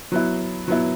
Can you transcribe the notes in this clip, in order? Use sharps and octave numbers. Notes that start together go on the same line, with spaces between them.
F#3 B3 E4
F#3 B3 E4